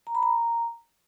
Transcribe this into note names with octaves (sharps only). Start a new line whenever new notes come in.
A#5
B5
A#5